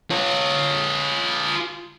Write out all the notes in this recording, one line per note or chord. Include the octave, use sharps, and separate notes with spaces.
F4 C#5